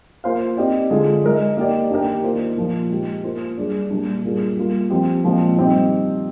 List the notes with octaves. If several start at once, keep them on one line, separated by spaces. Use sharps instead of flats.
A#3 F4 C5 F5
C4 D#4 G4 D5
D3 G#3 D4 F4 G#4
G#3 D#4 A#4 D#5
A#3 D#4 G4 D5
D#3 A#3 D4 G4 A#4
D#3 A#3 F4 C5
A#2 F3 A#3
G#3 D#4 G4
A#3 F4 C5
G3 D4 G#4 D5
A#2 G3 D4
G3 A#3 F4 G#4
G3 A#3 F4
F3 C4 G4 C5
A#2 F3 G#3 C4
D#3 G3 C4 D#4 G4